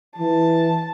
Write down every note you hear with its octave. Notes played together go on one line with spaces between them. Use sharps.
E3 A5